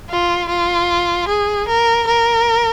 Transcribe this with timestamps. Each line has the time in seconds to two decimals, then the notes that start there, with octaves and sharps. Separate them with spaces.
0.10 F4
0.49 F4
1.29 G#4
1.68 A#4
2.08 A#4